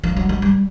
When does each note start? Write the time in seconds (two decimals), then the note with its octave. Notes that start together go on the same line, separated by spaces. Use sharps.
0.04 F3
0.17 F#3
0.29 F#3
0.42 G3